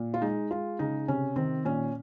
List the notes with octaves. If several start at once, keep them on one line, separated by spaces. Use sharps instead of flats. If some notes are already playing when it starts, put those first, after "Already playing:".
Already playing: A#2
F4
G#3 D#4
G#3 F4
C#3 D#4
C3 C#4
D#3 C4
A#2 C#4